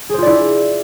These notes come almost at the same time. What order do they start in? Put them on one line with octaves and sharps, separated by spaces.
G#4 C5 F4 D5 E4